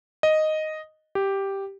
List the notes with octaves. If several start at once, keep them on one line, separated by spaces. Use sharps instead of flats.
D#5
G4